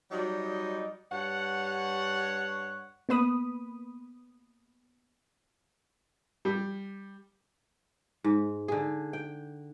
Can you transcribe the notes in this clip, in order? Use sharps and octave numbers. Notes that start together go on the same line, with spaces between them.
F#3 G3 D#4 D5 D#5
G2 C#5 F#5
A#3 B3 B4 B5 D#6
G3
G#2
D3 G#4
G5